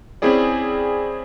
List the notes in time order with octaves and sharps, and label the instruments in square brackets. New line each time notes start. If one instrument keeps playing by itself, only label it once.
[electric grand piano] C4 C#4 E4 G#4 D5